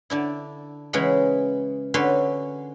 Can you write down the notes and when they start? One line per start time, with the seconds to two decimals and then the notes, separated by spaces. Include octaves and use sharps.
0.10 D3 D4 E4
0.93 C#3 E3 G#3 F#5 B5
1.94 D3 C#4 F#4 B4 C#5 C6